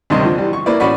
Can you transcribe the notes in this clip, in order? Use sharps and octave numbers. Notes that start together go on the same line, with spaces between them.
D2 G2 C3 D#3 D#5 C6
D3 F3
E3 G3
C#6
A#3 E4 B4 D5
A1 C#4 F#4 D5 B5 C#6